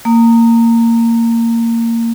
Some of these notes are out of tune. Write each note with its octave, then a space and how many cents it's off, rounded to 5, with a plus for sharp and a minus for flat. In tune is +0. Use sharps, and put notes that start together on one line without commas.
A#3 -20